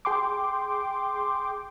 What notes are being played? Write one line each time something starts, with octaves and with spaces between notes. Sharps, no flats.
G#4 G5 C6 D6